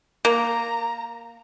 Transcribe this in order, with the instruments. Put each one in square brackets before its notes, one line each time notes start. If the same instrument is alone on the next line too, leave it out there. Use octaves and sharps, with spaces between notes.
[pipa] A#3 [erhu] A#5